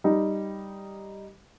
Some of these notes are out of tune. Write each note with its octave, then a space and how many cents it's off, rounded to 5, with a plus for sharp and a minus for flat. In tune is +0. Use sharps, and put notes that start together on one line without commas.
G3 +0 D#4 +0